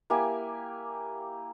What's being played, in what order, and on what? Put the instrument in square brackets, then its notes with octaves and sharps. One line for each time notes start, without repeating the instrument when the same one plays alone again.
[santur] A#3 E4 G4 G#5